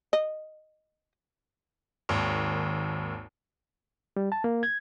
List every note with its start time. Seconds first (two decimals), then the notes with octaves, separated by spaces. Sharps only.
0.13 D#5
2.09 G#1 D#2
4.16 G3
4.32 A5
4.44 A#3
4.63 G#6